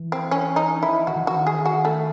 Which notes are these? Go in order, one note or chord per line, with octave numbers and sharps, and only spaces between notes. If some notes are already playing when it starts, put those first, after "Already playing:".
Already playing: E3
C4
C#4
D#4
E4
D#3 F#4
E3
D#3 F#4
G#4
F#4
A3